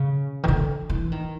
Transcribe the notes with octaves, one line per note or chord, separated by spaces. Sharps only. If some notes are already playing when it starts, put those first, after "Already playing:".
Already playing: C#3
D#3
D3
E3
D#3